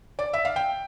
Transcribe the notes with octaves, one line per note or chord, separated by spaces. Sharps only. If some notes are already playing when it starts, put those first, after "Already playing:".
D5
E5
F5
G5